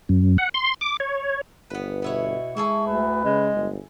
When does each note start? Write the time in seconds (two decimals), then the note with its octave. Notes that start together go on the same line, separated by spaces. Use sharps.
0.09 F#2
0.38 F#5
0.54 C6
0.81 D6
1.00 C#5
1.70 G1 B3 B4
2.02 B2 B3 E4 C#5
2.57 G#3 E4 G#4 A4 C#6
2.87 D2 B4
3.25 C#3 G#3
3.56 G1